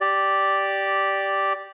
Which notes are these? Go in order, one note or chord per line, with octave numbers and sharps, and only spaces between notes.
G4 D5